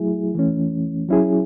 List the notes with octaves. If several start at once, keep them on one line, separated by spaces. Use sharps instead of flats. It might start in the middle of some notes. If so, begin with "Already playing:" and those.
Already playing: F#3 A3 E4 G#4
E3 A3 C#4
F#3 C#4 E4 G#4